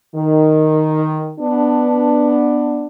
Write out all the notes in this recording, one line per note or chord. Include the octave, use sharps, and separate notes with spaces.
D#3
B3 D4